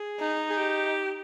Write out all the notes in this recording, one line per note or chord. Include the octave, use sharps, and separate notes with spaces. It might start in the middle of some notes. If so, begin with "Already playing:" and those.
Already playing: G#4
D#4
G#4
G4